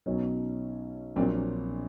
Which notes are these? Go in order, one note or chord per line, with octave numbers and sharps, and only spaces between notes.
B1 B2 F#3 C#4 D#4
A#1 A#2 F#3 C4 D4